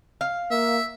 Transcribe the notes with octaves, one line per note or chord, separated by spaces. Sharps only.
F5
A#3 E5